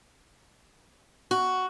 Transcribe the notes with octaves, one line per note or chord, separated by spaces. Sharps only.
F#4